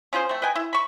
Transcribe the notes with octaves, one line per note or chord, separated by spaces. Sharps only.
C#4 F4 G#4 C5
A3 C4
B4 D#5 G5 G#5
E4
B5 C#6